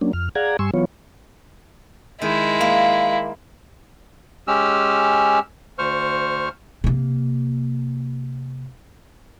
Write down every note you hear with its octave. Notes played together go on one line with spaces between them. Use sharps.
F#3 A#3 C#4 D4
F2 F6
G#4 D5 F5 F#5 A#5 G#6
G2 G3 G#5 C6 C#6 E6
E3 F#3 B3 F4 C#5
D#3 G#3 E4
A#3
G#3 C#4 G4 E6 F6
D2 C5 C#6 F6
C3 A#3